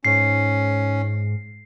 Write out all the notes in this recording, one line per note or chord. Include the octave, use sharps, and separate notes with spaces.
G#2 C#4 C7